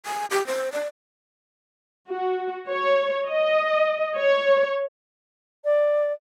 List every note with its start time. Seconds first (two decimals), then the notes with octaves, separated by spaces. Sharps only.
0.06 G#5
0.31 G4
0.47 C5
0.72 D5
2.10 F#4
2.69 C#5
3.28 D#5
4.17 C#5
5.64 D5